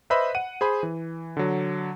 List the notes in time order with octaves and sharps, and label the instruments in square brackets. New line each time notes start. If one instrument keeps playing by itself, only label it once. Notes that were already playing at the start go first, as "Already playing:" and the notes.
[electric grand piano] B4 C5 D#5 E5 B5
F#5 D#7
G#4 C5 B5
E3
D3 F#3